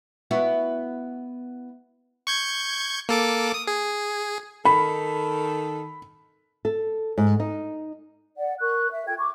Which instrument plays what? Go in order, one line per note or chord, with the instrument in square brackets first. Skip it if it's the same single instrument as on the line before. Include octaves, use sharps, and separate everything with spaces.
[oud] B3 E4 F#4
[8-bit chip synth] C#6 G6 G#6
A#3 A4 D6
D#6
G#4
[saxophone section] D#3 A4 [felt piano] B5
[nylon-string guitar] A4
G#2
D#4
[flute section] D5 F#5
A#4 C#6 F#6
E5
F4 A4 G5 G#6
C#6 D6